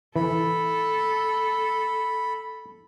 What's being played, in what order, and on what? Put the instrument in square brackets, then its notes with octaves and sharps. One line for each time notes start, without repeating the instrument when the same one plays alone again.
[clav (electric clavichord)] E3 [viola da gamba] A4 [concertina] B5